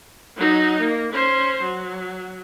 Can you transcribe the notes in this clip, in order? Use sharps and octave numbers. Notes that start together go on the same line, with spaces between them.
F#3 D#4
A#3
C#4 C5
F#3